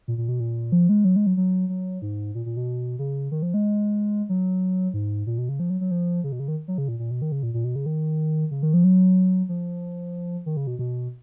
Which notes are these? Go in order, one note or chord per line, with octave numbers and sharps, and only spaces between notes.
A#2
A#2
B2
A#2
F3
G#3
F#3
G#3
F#3
F#3
F#3
G#2
A#2
A#2
B2
C#3
D#3
F3
G#3
F#3
G#2
A#2
B2
C#3
F3
F#3
F#3
F3
C#3
B2
C#3
D#3
F#3
C#3
A#2
A#2
B2
D#3
C#3
A#2
A#2
B2
C#3
D#3
C#3
D#3
F3
F#3
F3
D#3
C#3
B2
B2